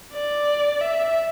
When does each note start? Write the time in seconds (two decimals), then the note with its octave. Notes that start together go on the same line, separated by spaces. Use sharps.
0.14 D5
0.81 E5